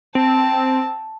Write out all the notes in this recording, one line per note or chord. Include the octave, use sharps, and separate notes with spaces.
C4 A5